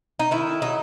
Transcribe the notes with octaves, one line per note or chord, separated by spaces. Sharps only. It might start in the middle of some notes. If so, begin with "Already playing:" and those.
D#4
D#3 E4
A3
F#3 D#4